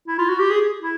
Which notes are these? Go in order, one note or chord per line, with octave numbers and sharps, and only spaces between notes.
E4
F4
F#4
G4
G#4
E4